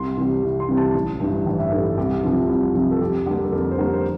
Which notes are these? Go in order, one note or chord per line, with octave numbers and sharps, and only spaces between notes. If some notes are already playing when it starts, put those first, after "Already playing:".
Already playing: C2 C6
C3 E3 G3
C2
C6
C3 E3 G3
A5
A1
G2 E3 G3
A1 G5
E5
G2 E3 G3 A4
G4
C2 G4
C3 F3
C2
C3 F3
A4
F2 G4
D3 G3 A#3 G4
A4
F2 A#4
C5
D3 G3 A#3 A#4
C5